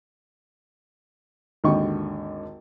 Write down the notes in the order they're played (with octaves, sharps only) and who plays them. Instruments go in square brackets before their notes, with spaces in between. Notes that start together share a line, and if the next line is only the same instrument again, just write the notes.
[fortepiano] G#1 D#2 D3 D#5 G5 C#6